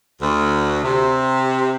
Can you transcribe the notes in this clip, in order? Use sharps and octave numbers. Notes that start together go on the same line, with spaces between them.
D2
C3